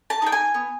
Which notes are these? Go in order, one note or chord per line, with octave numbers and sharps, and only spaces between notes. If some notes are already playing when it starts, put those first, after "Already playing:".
A5
D#4 G#4 G5
G#5
B3